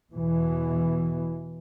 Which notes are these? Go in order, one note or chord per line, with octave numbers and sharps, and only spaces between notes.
E2 B2 E3